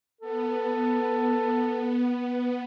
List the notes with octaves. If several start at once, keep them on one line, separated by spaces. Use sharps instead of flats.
B3 A4